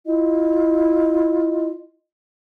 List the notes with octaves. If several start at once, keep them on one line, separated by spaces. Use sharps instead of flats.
E4 F4 D#5